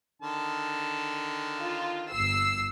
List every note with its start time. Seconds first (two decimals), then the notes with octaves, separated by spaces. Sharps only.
0.22 D3 D#3 A5
1.61 F4
2.11 G1 E6 C7